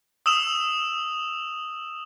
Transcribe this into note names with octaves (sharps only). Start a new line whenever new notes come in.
D#6 E6 E7 F7